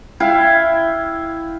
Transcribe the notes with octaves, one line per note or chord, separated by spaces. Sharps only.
E4 F5 G5